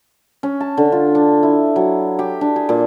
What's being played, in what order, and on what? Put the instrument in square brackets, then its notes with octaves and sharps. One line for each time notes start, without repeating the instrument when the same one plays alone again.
[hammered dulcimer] C#4
A5
D3
F4
D4
E4
F#3
G4
D4
G#4
A#2